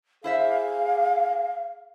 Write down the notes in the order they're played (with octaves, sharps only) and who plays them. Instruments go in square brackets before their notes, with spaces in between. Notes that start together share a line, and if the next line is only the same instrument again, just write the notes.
[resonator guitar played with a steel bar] E4 C5 E5 [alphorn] G#4 [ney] F5